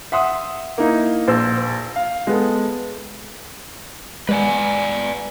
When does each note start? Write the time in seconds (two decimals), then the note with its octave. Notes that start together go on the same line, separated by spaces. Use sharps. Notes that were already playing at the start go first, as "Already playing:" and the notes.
0.12 E5 F#5 C6 D#6
0.78 A#3 D#4 E4
1.28 A#1 C5 E6
1.96 F5
2.27 G#3 B3 A4
4.29 G#3 B4 D5 G#5